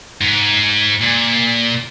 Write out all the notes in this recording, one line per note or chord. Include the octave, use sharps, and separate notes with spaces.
G#2
A#2